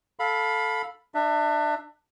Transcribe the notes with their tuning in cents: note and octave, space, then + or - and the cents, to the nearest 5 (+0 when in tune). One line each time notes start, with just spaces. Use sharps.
A4 +0 F5 +20 B5 +0
D4 +30 E5 +0